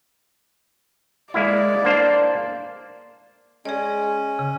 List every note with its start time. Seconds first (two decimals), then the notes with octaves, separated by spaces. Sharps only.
1.34 G#3 A#3 E4 D5
1.85 A#3 D4 C5
3.65 G#3 C#4 G#4 D5
4.39 C#3